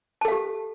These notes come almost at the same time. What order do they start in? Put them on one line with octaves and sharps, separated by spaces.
A5 A4 F5 G4